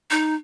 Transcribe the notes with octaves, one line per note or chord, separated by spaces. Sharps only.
D#4